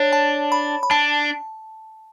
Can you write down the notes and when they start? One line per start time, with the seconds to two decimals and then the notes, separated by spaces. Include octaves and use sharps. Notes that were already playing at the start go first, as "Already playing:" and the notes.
Already playing: D4 C#5
0.13 A5
0.52 B5
0.83 B5
0.91 D4 A5